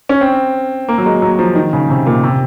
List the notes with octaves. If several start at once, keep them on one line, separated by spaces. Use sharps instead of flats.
C#4
C4
A#3
F#3
G#3
F#3
F3
D#3
C#3
C3
A#2
C3